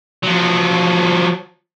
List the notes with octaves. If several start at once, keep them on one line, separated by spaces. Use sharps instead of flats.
F3 F#3